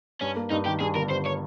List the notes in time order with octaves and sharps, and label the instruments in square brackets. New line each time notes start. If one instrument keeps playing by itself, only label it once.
[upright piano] G2 [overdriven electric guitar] C#4
[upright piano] A#3
[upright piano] G2 [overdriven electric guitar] D#4
[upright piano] D#3 [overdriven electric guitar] G4
[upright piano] G2 [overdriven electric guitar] G#4
[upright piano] G1 [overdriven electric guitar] A#4
[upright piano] G2 [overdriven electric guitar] C5
[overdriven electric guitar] C#5